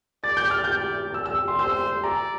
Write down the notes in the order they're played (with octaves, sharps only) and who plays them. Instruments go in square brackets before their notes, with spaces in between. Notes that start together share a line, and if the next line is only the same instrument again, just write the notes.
[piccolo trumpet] D5 [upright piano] A6
[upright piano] G6
F6
[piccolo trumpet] D5 [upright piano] G6
[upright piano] E6
E6
C6
[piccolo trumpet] C5 [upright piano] E6
[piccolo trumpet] D5 [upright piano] A#5